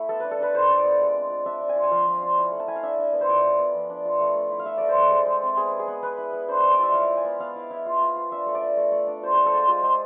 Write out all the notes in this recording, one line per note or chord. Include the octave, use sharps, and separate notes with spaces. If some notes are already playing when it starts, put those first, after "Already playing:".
Already playing: A3 E4
B3 A4
D4 B4
A4
D4 B4
F4 C5
D4
D5
B3
G#3
C4
F4
D4 E5
D4
G#5
F4
G#5
F3 F5
F3
F4
E4
A3
A5
E4 G#5
F5
D4 E5
D4
B3
C5
F4 D5
B3
B3
F3
D4
F4
A3
A3
E4
F5
A3 E5
A3 D5
C5
D4 A4
G#3
G#3
C4
B3 G#4
B3
G#4
B3
B3 B4
E4
B3
D4 C5
G#3 C5
D5
F4 E5
E4 F5
E4
G#5
B3
B3 F5
E4
E4
F4
F4
F4
D4 E5
A3
D5
D4
A3
A3
D4
F4 C5
F4 C5
A4
G#3 F4
G#3 F4
G#3